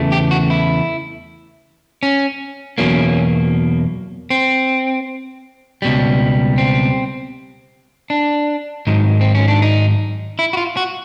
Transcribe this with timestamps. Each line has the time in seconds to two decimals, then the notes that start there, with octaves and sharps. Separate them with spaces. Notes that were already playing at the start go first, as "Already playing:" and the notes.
Already playing: E2 C#3 E3 A3
0.12 G4
0.31 F#4
0.50 E4
2.03 C#4
2.78 E2 B2 F#3 A#3 C#4
4.30 C4
5.82 C#2 B2 G3
6.58 C4
8.10 D4
8.87 G#2 D#3 F#3
9.21 C4
9.35 C#4
9.48 D4
9.62 D#4
10.39 E4
10.53 F#4
10.57 F4
10.77 F#4